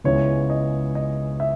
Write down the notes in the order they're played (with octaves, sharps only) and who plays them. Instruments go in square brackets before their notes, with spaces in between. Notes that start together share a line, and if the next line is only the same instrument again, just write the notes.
[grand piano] C#2 C#3 G#3 B3 E4 C#5
D#5
D#5
E5